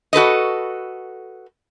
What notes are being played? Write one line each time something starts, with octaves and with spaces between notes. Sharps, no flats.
F#4 A4 B4 D#5